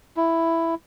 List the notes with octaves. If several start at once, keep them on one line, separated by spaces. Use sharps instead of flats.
E4